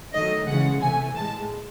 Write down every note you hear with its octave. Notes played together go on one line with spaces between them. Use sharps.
D#3 F#3 A3 D#5
C#3 E3 G#3 F#5
C3 E3 A3 G#5
A2 G#3 A5